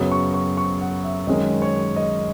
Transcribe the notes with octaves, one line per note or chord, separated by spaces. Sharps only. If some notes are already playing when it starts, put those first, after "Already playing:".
Already playing: F#2 C#3 F#3 B3 D#6
C#6
C#6
C#6
F#5
E5
F#2 D#3 G#3 C#4 D#5
C#5
D#5